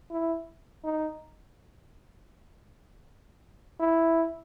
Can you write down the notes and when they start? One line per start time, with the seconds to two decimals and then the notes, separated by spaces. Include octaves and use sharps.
0.11 E4
0.84 D#4
3.80 E4